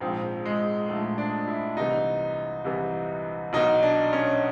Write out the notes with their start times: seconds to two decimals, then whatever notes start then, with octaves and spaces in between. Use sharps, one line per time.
0.01 A#1 G#2 F3 C4
0.45 G#3
0.88 A#1 G#2 F3 A3
1.18 D4
1.48 E4
1.77 C2 C3 E3 D#4
2.65 C2 C3 E3
3.53 B1 B2 D#4
3.83 D4
4.13 C#4